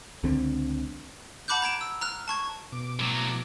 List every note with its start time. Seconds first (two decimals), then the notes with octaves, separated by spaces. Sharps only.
0.24 C#2 D3 C4
1.48 F#5 A5 B5 D6 F#6 G6
1.62 A#5 G#6 D7 E7
1.81 E6
2.01 A#5 F6 F#6
2.28 A5 C#6 G#6
2.72 B2 D6
3.00 A2 F#3